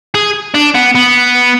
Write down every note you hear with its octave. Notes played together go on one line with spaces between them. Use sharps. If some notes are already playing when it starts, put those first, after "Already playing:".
G#4
D4
B3
B3